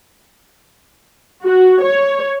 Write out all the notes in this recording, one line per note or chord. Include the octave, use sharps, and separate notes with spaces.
F#4
C#5